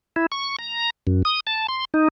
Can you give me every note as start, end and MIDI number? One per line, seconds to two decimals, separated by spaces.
0.16 0.26 64
0.32 0.56 85
0.59 0.90 82
1.07 1.22 42
1.25 1.40 87
1.47 1.67 81
1.69 1.85 84
1.94 2.08 63